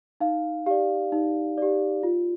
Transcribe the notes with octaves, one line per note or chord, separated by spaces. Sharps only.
D#4 F5
G4 D5 F5
D#4
G4 D5
F4